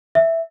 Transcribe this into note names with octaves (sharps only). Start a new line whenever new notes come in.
E5